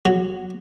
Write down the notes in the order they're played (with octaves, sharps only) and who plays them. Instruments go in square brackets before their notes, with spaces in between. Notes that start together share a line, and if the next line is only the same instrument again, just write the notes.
[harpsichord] F#3